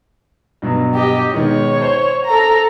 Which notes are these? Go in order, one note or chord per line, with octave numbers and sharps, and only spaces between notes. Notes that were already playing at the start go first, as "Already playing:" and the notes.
G2 B2 F#3
G4 D#5
G#2 B2 D#3 C#5
C5
A4 A#5